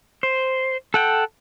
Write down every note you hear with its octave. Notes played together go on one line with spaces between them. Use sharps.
C5
A4 F#5 G5